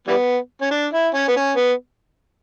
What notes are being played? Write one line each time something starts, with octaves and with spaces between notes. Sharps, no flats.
E3 G3 B3
C#4
D4
E4
C#4
B3
C#4
B3